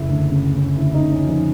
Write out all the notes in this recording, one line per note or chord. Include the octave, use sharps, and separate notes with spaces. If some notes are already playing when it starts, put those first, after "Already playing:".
Already playing: F#1 E4
D2
C#3
C#3
D2 E4
D#4
C#3
C#4
F3
D#4